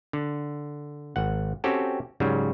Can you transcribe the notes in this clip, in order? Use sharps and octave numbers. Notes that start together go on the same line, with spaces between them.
D3
G#1 F#5
C4 C#4 F#4 G4 A4
G#2 C#3 F#3 G3